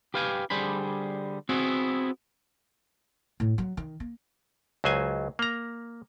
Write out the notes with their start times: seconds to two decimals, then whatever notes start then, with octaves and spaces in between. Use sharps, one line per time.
0.14 G4 B4 F5 G5 G#5
0.50 D3 G3 G#4 C5 B5
1.49 B3 C4 E4 F#4 G#4
3.40 A2
3.58 F#3
3.77 D#3
4.00 A#3
4.84 C#2 F#3 C5 G#5
5.39 A#3 A#5